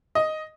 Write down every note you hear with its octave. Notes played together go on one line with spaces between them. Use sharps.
D#5